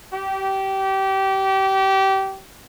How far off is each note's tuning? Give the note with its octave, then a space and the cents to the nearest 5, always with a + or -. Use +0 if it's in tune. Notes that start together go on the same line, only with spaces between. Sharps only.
G4 -25